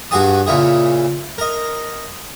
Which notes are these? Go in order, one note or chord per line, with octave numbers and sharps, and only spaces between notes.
G2 F#4 G#4 G#5 A5 D#6
A#2 C#3 E4 G#4
A#4 D#5